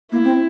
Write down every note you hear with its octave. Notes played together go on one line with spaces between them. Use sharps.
A#3 E4
C4